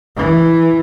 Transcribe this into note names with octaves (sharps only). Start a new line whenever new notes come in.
E3